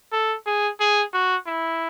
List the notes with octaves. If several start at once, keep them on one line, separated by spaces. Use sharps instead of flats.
A4
G#4
G#4
F#4
E4